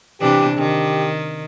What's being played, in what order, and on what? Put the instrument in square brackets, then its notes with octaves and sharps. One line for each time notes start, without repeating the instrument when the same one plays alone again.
[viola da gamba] C3 E3 D4 [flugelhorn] G4
[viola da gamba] D#3 [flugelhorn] G4